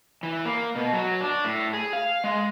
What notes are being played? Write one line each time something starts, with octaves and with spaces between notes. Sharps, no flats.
E3
A#3
B2
F#3
D4
A2
G#4
F5
G#3